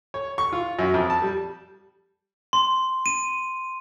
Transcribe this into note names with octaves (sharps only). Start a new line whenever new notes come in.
C#5
C#6
F4
F#2
F2
A5
G3
C6
D#7